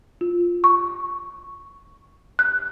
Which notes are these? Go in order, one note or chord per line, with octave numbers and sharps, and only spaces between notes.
F4
C#6
F#6